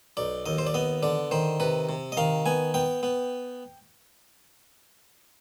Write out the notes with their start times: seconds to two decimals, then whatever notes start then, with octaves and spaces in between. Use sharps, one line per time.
0.17 B1 D5
0.46 D#2 D#5
0.58 C5
0.67 D5
0.74 B3 D#5
1.03 D3 D5
1.31 D#3 C5
1.60 C3 B4
1.89 C3
2.12 D#5
2.17 D#3 F5
2.46 B3 G#5
2.74 B3 G5
3.03 B3